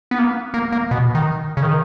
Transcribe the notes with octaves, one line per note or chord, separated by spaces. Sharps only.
B3
A#3
A#3
A#3
B2
D#3
C#3
D#3